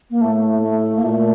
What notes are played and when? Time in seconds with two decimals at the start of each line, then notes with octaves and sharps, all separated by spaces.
0.11 A#3
0.21 A2 A3
0.63 A3
0.96 A#3
1.03 A#2 A3